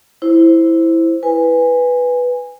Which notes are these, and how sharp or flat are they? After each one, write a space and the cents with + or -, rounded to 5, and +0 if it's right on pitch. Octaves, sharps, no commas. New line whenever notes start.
E4 +0 C5 +0
B4 +0 G#5 -15